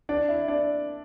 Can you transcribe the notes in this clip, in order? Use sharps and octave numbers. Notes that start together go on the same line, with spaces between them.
D4 D5
E4 E5
D4 D5